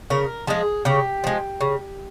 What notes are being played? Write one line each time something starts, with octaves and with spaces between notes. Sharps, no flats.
C#3 A#4
F3 G#3 G#4
C#3 G4
F3 G#3
C#3